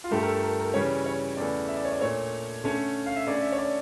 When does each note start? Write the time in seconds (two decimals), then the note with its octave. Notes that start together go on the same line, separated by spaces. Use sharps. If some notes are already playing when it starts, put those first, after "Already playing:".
0.04 F4
0.11 G2 D3 A3 G4
0.22 A#4
0.27 A4
0.43 A#4
0.59 A#4
0.74 C#3 E3 G3 C#5
1.06 C#5
1.37 E2 C#3 E3 A3 D5
1.68 E5
1.77 D5
1.85 C#5
1.92 D5
2.00 A#2 A3 D4 C#5
2.64 D3 A3 C#4
3.06 F5
3.16 E5
3.27 D3 A3 C#4 D5
3.42 E5
3.52 C#5
3.58 D5